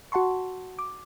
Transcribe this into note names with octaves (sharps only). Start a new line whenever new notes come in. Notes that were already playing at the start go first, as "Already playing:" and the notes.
F#4 F#5 A5 C6 C#6
D6